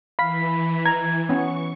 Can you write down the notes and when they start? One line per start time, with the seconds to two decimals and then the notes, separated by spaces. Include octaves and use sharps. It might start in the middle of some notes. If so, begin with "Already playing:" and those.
0.19 E3 F5 B5 B6
0.85 A#5 G#6
1.29 B3 C#4 C#6